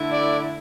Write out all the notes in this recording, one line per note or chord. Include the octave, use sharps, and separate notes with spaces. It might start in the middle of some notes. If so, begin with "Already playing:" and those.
Already playing: D3 A3 E4
D5